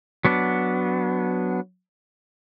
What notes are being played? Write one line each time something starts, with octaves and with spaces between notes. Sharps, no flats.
F#3 B3 D4